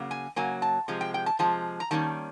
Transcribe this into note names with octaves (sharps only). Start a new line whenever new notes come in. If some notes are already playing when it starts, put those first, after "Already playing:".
Already playing: C#3 F#3 A#3
G#5
C#3 F#3 A#3 G#5
A5
C3 F3 G#3
G5
G5
A5
C3 F3 G#3 A5
A#5
D#3 G3 A#3 C#4 A5